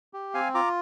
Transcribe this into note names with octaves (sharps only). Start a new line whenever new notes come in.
G4
C4 F5 G#5
F4 A#5 D6